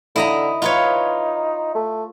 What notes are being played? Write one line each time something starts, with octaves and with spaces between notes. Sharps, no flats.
D3 E4 D#5 A#5
D#4 F4 B4 C#5
A3